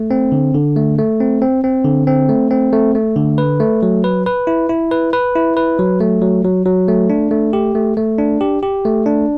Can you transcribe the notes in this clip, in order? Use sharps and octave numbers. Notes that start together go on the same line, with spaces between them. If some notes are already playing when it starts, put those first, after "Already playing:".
Already playing: A3
C4
D3
D3
A3
A3
C4
C4
C4
D3
C4
A3
C4
A3
A3
D3
B4
A3
F#3
B4
B4
E4
E4
B4
B4
E4
B4
F#3
A3
F#3
F#3
F#3
A3
D4
A3
G4
A3
A3
D4
G4
G4
A3
D4